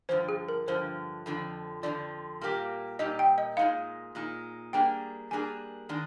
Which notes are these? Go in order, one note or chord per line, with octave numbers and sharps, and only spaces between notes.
G2 D3 F3 C5
G#4
A#4
G2 D3 F3 C5
F2 D3 F3
F2 D3 F3 D5
A#2 G3 A#3 D#4 G4
A#2 G3 A#3 D#4 G4 D#5
G5
D#5
A#2 G#3 D#4 F5
A#2 G#3 D#4
G3 A#3 D4 G#4 G5
G3 A#3 D4 G#4 G#5
D#3 G#3 D4 G#4